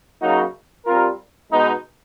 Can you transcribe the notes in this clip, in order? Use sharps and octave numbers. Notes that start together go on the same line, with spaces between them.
C#3 F#3 A#3 D#4 F#4
G3 C4 F4 A#4
B2 G#3 B3 D#4